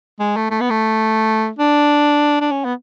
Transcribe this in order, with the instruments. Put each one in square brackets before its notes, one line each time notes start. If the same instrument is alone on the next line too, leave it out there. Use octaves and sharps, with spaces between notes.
[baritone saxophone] G#3
A3
A3
B3
A3
D4
D4
C#4
B3